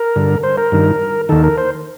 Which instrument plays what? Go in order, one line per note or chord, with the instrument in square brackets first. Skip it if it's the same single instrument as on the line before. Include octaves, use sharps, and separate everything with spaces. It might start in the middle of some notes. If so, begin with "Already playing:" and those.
Already playing: [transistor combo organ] A#4
G2 D3
C5
A#4
G2 D#3
D#2 D#3 A4
A#4
C5